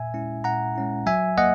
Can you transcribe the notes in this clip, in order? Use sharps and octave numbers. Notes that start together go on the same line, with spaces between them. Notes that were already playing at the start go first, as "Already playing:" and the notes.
Already playing: A#2 E5 G#5
G#3 C#4 E4
A#2 F#5 A#5
G#3 C#4 E4
F#3 E5 G#5
A#3 D#5 F#5